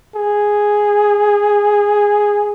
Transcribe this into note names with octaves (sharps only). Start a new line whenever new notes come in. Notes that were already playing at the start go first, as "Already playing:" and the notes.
G#4